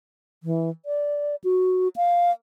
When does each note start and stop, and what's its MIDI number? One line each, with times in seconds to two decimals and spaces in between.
0.43 0.70 52
0.86 1.36 74
1.44 1.88 66
1.96 2.31 77